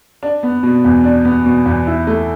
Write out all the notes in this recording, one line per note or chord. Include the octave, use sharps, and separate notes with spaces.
D4
B3
B2
E2
D4
B3
B2
E2
E4
A3